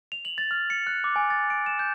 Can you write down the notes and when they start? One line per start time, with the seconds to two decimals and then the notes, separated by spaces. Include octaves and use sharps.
0.12 F7
0.25 F#7
0.38 A6
0.51 F6
0.70 C#7
0.87 F#6
1.04 D6
1.16 G#5
1.30 A6
1.50 D7
1.66 E7
1.79 G6